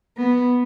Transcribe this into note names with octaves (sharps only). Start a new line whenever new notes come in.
B3